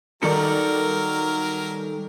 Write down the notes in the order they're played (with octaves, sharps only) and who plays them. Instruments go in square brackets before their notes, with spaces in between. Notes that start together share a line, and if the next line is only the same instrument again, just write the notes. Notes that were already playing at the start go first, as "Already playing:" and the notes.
[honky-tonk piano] D#3 D5 [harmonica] F#3 A#4 [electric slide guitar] G3 D#4 A4